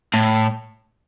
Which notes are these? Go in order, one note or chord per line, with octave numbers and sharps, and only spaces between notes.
A2